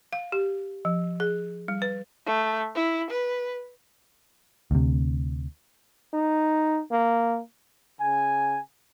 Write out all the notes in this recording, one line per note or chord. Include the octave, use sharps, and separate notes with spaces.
F5
G4
F3
G#4
G3
B4
A3
E4
B4
D2 C3
D#4
A#3
C#3 G#5